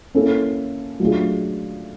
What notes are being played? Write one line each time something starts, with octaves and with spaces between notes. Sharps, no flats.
A#3 C#4 E4 A4
F#3 A3 D4 F4 G#4